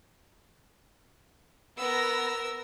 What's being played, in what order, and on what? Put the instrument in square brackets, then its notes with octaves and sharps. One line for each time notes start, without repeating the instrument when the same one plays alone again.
[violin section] B3 A#6 [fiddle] A#4 E6